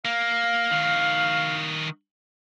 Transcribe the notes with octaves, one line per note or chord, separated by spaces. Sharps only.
A#3 F5
D#3 F#4